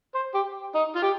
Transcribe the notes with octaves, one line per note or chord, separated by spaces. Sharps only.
C5
G4
D#4
F4
G4